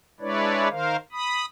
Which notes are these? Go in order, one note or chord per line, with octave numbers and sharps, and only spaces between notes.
G#3 D4 E4 B4 C#5 D5
D#3 A#4 C5 F5
B5 D#6